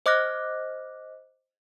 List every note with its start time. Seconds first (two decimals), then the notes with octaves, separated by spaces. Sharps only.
0.06 C5 D#5 D6 F6 F#6 A#6